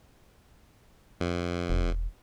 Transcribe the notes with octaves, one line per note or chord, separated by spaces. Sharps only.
F2
E1